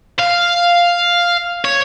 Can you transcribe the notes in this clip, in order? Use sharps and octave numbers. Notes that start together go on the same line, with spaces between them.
F5
C#5